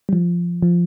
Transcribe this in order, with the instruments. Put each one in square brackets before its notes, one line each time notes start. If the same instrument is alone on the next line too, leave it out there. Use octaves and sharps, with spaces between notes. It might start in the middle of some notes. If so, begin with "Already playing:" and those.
[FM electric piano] G3
F3
F3